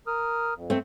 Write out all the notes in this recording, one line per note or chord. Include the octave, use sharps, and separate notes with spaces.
A#4 D#6 F6
F2
A3 C4